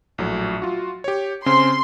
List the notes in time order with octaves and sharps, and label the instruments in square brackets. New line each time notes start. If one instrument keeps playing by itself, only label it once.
[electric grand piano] A#1 A2 F#3
F4 F#4
G4 C#5
[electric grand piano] C#3 C4 C#4 [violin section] C6